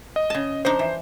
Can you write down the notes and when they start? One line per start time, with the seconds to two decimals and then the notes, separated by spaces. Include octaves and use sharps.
0.16 D#5
0.30 C#3 A5
0.65 F3 D4 D#4 C5
0.79 E3